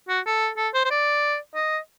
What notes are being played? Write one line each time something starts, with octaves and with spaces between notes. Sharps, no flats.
F#4
A4
A4
C5
C5
D5
D#5